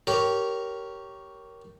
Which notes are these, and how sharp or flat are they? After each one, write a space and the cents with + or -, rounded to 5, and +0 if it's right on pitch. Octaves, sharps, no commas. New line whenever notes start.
G4 -15 A#4 +0 C#5 +0